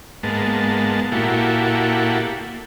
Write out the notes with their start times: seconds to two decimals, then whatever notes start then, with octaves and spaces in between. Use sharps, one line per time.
0.23 G#2 G#3 A#3 B3 A5
1.12 A#2 A#3 E4 F#4 G4 A4